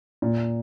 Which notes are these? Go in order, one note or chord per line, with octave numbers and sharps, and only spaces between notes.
A#2